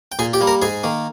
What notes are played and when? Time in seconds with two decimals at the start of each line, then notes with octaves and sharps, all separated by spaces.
0.12 G5
0.19 A#2 G#4 G#5
0.33 G4 G5
0.41 G3 A#3
0.47 A#4 A#5
0.62 G#2 G#4 G#5
0.84 D#3 A#3